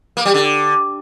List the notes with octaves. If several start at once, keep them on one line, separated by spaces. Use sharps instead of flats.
A#3
G3
D3